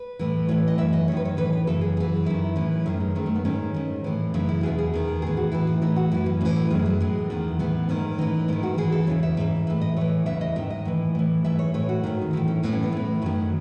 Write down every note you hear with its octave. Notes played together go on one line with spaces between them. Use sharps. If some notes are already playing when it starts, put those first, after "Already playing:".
Already playing: B4
A2 E3
A2 E3 C#5
D#5
F#2 E3 E5
D#5
F#2 D#3 B4 C#5
C#5
A2 E3 B4
B4
F#2 C#3 E3 A4
G#4
F#2 E3 G#4
F#2 D#3 E4
A2 E3 C#4
F#2 D#3 A3
G#3
F#2 D#3 A3
A3
B3
G#2 D#3 C#4
G#2 D#3
A2 E3
F#2 C#3 E3 D#4
E4
E2 B2 G#4
G#4
E2 D#3
A2 E3 G#4
F#4
A2 E3 E4
D#4
A2 E3 D#4
F#4
F#2 E3 E4
C#4
A2 E3 C#4
A3
F#2 D#3 G#3
F#3
A2 E3 G#3
E2 D#3
A2 E3 B3
G#2 D#3 C#4
A2 E3 D#4
G#2 D#3 E4
F#4
G#2 E3 G#4
A4
E2 C#3 E3 C#5
E5
G#2 E3
A2 E3 E5
D#5
A2 E3 C#5
E2 C#3 E3 E5
D#5
G#2 D#3 E5
D#5
A2 E3
A2 E3
G#2 E3 E5
C#5
A2 E3 C#5
F#4
G#2 D#3
D#4
A2 E3 E4
C#4
A2 E3 B3
C#4
B3
A2 E3 A3
F#2 D#3 F#3